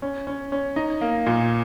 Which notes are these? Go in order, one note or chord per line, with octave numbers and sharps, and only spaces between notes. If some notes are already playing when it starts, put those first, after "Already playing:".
C#4
C#4
C#4
D#4
A#3
A#2